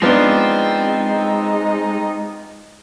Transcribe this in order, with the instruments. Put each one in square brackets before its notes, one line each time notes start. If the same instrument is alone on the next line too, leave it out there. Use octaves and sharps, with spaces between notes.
[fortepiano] F3 B3 D4 [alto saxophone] G#3 [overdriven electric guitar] C4 [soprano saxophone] D#4